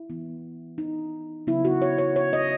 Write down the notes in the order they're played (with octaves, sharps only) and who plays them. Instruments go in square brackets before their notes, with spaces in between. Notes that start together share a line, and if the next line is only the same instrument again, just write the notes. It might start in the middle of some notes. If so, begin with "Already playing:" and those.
Already playing: [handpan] E4
E3 B3
D#4
C#3 F#3 B3 E4
F#4
C#5
C#5
C#5
D#5